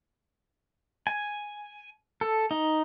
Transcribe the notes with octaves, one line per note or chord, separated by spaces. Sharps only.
G#5
A4
D#4